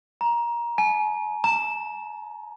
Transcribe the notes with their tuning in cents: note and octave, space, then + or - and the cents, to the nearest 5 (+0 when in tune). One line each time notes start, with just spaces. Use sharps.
A#5 +20
G#5 +45
A#5 -25